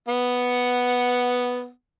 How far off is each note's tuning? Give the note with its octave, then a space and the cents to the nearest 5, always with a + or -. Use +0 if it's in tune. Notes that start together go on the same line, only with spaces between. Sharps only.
B3 +0 F#5 +0